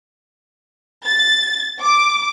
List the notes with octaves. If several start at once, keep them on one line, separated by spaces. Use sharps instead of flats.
A6
D6